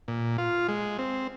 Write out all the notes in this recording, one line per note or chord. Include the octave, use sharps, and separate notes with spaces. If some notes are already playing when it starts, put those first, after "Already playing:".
A#2
F4
G#3
C4